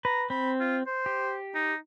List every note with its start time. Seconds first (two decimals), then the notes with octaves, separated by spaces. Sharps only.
0.05 B4 A#5
0.30 C4 B5
0.60 F4
0.87 C5
1.06 G4
1.55 D#4